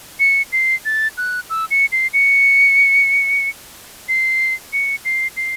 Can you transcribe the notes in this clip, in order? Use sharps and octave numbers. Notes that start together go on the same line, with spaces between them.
C#7
C7
A6
F#6
E6
C#7
C7
C#7
C7
C#7
C7
C7